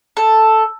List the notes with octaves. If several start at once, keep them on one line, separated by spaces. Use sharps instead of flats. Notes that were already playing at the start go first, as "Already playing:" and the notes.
A4